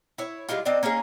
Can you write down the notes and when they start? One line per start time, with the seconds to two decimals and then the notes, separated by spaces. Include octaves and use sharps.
0.18 E4 C#5
0.49 G3 G#3 E4 F4
0.65 C4 D4 D#4 D5
0.83 A#3 C#4 D#4 G#4